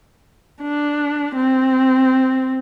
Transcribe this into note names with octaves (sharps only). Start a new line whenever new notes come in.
D4
C4